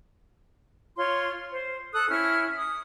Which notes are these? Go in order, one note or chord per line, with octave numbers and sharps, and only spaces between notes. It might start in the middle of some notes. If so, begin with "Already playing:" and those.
F4 C#5 C6
C5
A4 D#6 F#6
C#4 E4 F6
D#6